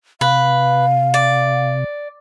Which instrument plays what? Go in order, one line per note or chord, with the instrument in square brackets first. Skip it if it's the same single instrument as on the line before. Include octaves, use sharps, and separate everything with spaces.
[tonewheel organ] C3 [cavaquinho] B4 [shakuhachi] F5
[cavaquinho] D5